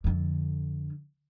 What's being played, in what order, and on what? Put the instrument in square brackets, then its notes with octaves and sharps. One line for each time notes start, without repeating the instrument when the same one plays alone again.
[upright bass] F2 D3